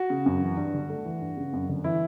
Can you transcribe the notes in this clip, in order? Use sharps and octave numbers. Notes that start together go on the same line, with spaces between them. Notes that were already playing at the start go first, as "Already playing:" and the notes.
Already playing: F#4
C#3
F#2
E3
G2
G1
A3
E3
G2
C#3
F#2
G1
E3 E4